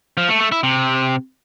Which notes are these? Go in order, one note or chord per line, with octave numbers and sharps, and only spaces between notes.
F3
A3
A3
E4
C3